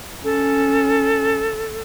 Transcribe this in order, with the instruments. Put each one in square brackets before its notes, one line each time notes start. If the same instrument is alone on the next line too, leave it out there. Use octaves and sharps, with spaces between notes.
[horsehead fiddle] C#4 [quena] A4